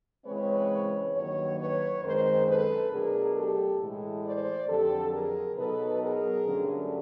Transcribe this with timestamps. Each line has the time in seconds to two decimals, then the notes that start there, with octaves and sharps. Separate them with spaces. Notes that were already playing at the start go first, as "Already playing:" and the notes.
0.25 C#3 E3 G#3 C4 B4 C#5
1.14 G2 D#3 F#3 A#3 B4 C#5
1.58 B4 C#5
2.03 F#2 D#3 G#3 C4 A#4 C5
2.47 A4 B4
2.90 B2 F#3 A3 D4 G#4 A#4
3.35 G4 A4
3.79 A2 E3 G#3
4.23 C5 D5
4.68 F2 D3 F#3 G4 A4
5.11 G#4 A#4
5.56 B2 F#3 B3 D#4 A4 B4
6.00 G#4 A#4
6.45 G2 D3 F#3 A3 C#4